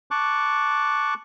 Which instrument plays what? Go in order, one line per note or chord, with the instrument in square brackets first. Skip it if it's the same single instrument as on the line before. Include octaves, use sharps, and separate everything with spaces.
[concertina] A5 C#6 D6 F#6